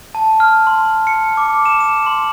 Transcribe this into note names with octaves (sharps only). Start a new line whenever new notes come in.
A5
F6
C6
C#7
D6
E7
E7
C6